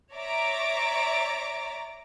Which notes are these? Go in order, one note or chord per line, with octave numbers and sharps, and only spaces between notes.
C#5 D5 E5 A#5 D6